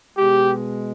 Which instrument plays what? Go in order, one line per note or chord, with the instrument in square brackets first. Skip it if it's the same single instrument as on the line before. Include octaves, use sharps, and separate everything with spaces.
[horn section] B2 G#3 G4